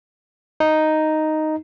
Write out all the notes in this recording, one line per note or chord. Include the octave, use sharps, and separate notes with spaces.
D#4